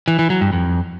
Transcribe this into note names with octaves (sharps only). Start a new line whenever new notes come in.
E3
E3
F#3
G2
F2